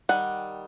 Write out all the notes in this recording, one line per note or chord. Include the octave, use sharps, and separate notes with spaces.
D#3 G3 F#5